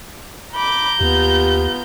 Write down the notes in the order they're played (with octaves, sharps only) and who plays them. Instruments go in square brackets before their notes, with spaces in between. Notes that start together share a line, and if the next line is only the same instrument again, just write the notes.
[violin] A#5 G6 [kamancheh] B5 D6
[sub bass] D#2 [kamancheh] B3 F4 [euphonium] G4